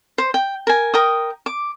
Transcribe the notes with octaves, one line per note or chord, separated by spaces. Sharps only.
C5
G5
A#4 G#5
A#4 G5 D#6
D6